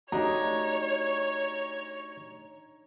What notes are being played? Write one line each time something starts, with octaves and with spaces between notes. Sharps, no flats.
A3 D4 D#4 F#4 G4 C#5 A#5